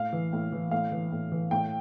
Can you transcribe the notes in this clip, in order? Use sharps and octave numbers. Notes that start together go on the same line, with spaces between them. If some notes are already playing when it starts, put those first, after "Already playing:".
Already playing: A2 F5
E3
A2
E3
A2 F5
E3
A2
E3
A2 G5